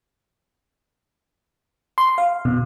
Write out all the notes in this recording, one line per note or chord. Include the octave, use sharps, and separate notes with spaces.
C6
F5
B2